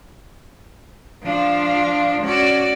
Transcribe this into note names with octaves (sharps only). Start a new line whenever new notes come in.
F3 D4 F4
C#4 F#4 D5